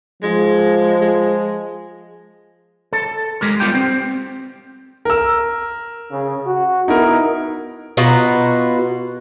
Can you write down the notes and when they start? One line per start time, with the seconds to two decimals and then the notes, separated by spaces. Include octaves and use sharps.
0.23 F3 G#3
1.02 G#3
2.93 A4
3.41 G#3 G4 A#4
3.60 G3 B3 F4 G4 G5
3.75 C4
5.05 A#4 E6
6.12 C#3
6.47 F#4
6.88 B3 D#4 E4 A#4
7.97 B2 F4 F#4 A#5